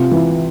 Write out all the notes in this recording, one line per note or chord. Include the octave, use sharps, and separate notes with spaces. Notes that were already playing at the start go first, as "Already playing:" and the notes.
Already playing: C3 F4
E3